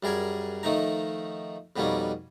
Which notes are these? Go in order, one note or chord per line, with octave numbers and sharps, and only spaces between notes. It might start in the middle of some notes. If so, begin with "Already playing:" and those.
F#2 G3 G#4 A#4 G#5
D#3 F3 A3 D#4 A#5
F2 B2 G3 A#3 C#4 D#4